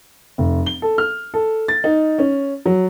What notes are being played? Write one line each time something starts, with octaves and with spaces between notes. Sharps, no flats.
F1
G7
A4
F6
A4
A6
D#4
C#4
F#3